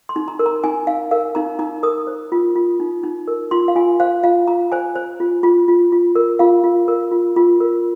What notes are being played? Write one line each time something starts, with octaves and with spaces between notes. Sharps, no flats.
C6
D#4
A#5
A#4
A#5
D#4 G#5
D#4 F5
A#4 F5
D#4 A#5
D#4 A#5
A#4 D#6
C5
F4
F4
D#4
D#4
A#4
F4 C6
F5
F4 G#5
C5 F5
F4 F5
F4 A#5
C5 G#5
C5
F4
F4
F4
F4
A#4
F4 F5
F4
A#4
F4
F4
A#4